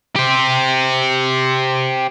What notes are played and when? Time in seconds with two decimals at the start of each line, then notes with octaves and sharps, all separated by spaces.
0.16 G4 C5